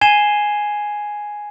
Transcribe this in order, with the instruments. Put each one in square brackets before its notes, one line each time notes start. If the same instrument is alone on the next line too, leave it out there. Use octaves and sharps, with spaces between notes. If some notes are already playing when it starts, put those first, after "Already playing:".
[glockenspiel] G#5 G#6 C7 D#7 E7 G7